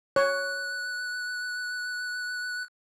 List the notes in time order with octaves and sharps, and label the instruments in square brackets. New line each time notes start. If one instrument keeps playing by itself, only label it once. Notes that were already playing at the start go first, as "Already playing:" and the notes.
[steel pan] C#5 [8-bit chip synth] F#6